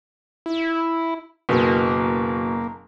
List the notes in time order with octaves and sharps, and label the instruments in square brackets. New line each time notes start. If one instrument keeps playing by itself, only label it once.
[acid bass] E4
[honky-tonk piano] F#1 [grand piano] B2 [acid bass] A#3